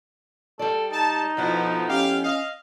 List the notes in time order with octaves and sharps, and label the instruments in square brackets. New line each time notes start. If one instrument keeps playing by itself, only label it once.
[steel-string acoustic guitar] G3 D5 [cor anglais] A4
[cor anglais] D#4 [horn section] A5
[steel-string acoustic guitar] F2 B3 E4 [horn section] B2 F3
[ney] C#4 [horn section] G4 F5
[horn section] D#5 F5